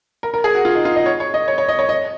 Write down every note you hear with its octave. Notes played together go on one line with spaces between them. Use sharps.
A#4
A#4
G#4
F#4
F4
D#4
F4
D#5
C#5
C#5
D#5
C#5
C#5
D#5
C#5
D#5